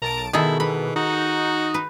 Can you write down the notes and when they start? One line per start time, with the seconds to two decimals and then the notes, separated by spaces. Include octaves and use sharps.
0.02 B1 A#4 A5 D7
0.33 B2 D#3 E4 G#4 A4
0.60 E3 B5
0.96 D#4 F#4
1.74 B4